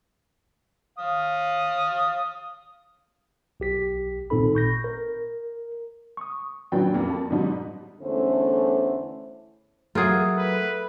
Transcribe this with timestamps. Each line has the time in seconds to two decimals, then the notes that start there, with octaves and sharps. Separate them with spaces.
0.98 F5 D#6
3.60 B1 G4 B6
4.30 G#1 A#2 C4 D#4 A4 B5
4.55 C#6 G6 A#6
4.84 A#4
6.17 C#6 D#6
6.72 A#2 F#3 D4 B4 G5
6.94 F2 G3 A#3
7.10 A5
7.30 G#2 B2 F#3 G3 D#4
8.01 E2 D3 A3 C#4 E4 C5
9.95 F#3 A3 F4 G#4 A#4 F#5
10.38 B4